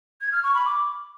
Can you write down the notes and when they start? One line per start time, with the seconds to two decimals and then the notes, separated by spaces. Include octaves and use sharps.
0.21 G#6
0.32 F6
0.43 C#6
0.54 B5
0.66 D6